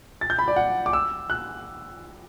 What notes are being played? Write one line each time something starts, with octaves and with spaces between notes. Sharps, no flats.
A6
G6
B5
D5
F#5
D6
E6
F#6